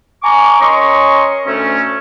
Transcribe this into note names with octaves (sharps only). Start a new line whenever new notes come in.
G#5 A#5 C#6 D6
C#4 A#4 D#5 C6 C#6
D2 A3 C#4